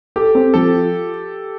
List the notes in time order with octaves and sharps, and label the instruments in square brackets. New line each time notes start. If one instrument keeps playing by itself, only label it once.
[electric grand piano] G4 [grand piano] A4
[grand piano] C4
[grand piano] F3 [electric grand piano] A4
[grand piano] F4